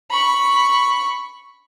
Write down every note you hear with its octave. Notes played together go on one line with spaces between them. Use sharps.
B5 C#6